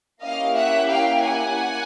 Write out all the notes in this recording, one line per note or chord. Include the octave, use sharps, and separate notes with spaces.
A#3 C#4 E4 G4 D#5 F5
E5 F#5
F5 G5
F#5 G#5
A#3